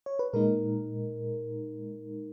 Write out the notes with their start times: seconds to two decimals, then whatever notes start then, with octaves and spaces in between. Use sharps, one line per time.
0.06 C#5
0.19 B4
0.33 A#2 G#3 D#4 A#4